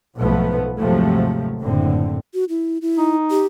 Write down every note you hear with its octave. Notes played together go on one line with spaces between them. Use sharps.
B1 G#2 F3 A3 B3
D#2 G#2 C3 F3 F#3 A3
F#1 A2 D3 C4
F#4
E4
E4
D#4
G4